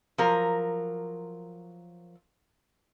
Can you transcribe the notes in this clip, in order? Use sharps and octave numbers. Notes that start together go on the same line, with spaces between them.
F3 F#3 A#4